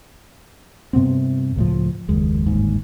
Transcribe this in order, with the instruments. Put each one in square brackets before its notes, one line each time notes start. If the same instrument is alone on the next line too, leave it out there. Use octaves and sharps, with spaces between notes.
[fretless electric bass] G2 C3 B3 C4
C#2 A2 F3
F#1 D#2 G#3
G1 D#2 G#2